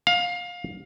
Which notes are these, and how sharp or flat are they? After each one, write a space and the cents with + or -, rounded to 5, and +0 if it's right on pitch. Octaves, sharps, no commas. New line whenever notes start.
F5 +20